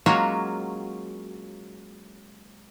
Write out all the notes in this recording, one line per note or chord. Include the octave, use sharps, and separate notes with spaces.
F#3 G#3 A#3 C#4 F4 F#4